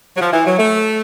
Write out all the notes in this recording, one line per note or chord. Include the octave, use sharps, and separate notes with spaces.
F#3
F3
E3
F#3
A3